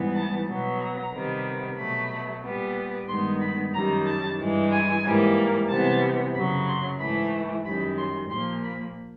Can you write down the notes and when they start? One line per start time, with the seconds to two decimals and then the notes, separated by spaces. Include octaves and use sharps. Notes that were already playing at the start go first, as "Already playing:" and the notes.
Already playing: G#2 E3 G3 B3
0.14 A5
0.47 B2 F#3 B3
0.79 A#5
1.12 C3 D#3 G3 B3
1.78 B2 F#3 A3 B5
2.42 A#2 G3 B3
3.07 G2 D#3 G#3 B3 C6
3.41 B5
3.73 F#2 D#3 G3 A#5
4.05 A5
4.38 G2 E3 G#3
4.71 G#5
5.03 G#2 E3 G3 A#3
5.68 C3 E3 G3 B3 A5
6.34 F#2 C#3 F#3 B5
6.67 C6
6.99 G#2 E3 A3 B5
7.65 F#2 D#3 G3 B5
7.97 C6
8.29 A#2 F3 A#3 C6
8.63 B5